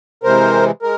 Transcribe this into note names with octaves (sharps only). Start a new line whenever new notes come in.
C3 E3 G#3 A#4 C5
G#3 A#4